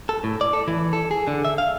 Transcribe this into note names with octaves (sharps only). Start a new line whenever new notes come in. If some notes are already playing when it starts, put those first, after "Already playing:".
A4
A2
D5
A4
E3
A4
G#4
D3
E5
F5